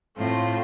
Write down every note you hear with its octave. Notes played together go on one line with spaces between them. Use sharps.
A2 A3 C4 F4